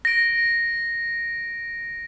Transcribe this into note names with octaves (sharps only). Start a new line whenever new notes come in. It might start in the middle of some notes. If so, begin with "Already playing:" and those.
A#6 D7